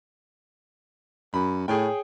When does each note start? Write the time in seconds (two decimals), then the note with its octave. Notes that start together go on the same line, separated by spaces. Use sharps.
1.34 F#2 B5
1.68 A2 G#4 C#5 G5